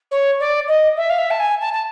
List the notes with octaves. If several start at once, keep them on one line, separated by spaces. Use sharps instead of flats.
C#5
D5
D#5
E5
F5
E5
A5
G#5
A5
A5